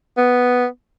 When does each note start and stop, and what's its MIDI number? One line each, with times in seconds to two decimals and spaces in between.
0.17 0.66 59